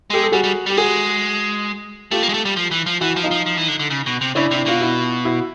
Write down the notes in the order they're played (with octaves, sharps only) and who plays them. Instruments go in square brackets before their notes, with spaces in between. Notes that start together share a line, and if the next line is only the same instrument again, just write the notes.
[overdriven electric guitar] G#3 [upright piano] G4 A4
[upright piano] A4
[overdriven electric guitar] G3 [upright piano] F#4 G#4
[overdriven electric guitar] G3
[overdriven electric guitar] G3 [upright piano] G4
[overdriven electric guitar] G#3 [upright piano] F#4 G#4
[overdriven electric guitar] A3 [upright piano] F4 G4
[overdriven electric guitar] A#3
G#3
A3
G3
F3
E3
F3
[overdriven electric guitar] E3 [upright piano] E4 F#4
[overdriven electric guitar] F3
[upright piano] D#4 F4
[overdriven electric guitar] F3
F3
E3
D3
D3
C#3
B2
C3
[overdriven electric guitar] C#3 [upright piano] D4 E4
[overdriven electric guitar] C3 [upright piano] E4
[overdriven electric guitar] B2 [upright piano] F4
[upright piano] E4 F#4
E4 F#4